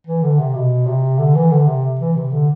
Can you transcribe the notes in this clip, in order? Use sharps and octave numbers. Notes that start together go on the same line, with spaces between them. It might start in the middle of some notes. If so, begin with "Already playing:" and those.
E3
D3
C3
B2
C3
D3
E3
D3
C3
E3
C3
D3